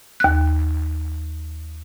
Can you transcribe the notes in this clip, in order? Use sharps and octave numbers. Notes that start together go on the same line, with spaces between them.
D#2 F#6